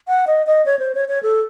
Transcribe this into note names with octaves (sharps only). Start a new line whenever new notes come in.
F#5
D#5
D#5
C#5
C5
C#5
C#5
A4